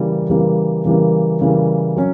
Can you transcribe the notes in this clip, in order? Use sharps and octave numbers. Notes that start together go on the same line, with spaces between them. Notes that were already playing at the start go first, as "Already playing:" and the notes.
Already playing: C#3 E3 G3 A#3
C#3 E3 G3 A#3
C#3 E3 G3 A#3
C#3 E3 G3 A#3
F#3 C#4